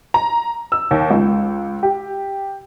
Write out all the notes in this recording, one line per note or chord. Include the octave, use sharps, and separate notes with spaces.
A#5
E6
D#2
C#2
G4